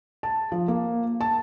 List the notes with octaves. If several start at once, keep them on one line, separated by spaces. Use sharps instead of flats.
A5
F3
A#3
A5